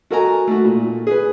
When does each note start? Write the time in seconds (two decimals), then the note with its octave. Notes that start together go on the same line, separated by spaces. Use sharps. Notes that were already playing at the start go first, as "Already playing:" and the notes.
0.11 F#4 A4 A#4 D#5 G#5 A#5
0.47 A3 F#4
0.65 A#2
1.07 G#4 B4